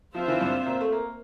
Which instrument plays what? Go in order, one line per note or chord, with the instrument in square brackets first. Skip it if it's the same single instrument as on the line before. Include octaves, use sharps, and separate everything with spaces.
[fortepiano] F3 [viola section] C4 F4 C5 E5
[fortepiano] E3
G2
A#2
A3
A#3